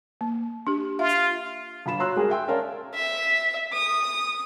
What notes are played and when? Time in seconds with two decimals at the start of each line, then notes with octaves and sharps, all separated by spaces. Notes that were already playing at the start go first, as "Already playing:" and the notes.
0.21 A#3
0.67 D4 G4
0.99 F4 E5
1.86 G1 F4 B5 E7
1.99 F#4 C#5 A#5 C6 E6 F#6
2.16 G#3 G#4 A#4
2.30 E5 G5 C6 E6
2.48 C#4 A#4 D5 F5 A5 C6
2.94 E5
3.73 D#6